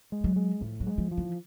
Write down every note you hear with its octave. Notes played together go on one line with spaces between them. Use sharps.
G#3
F#3
G#3
A2 F3
F#3
G#3
F3
F3
E3